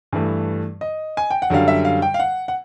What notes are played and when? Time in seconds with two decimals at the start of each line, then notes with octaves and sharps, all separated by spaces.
0.13 G2 E3 A3
0.81 D#5
1.17 G#5
1.31 G5
1.42 F#5
1.50 F#2 D3 G3 F5
1.68 E5
1.85 F5
2.02 G5
2.14 F5
2.19 F#5
2.48 F#5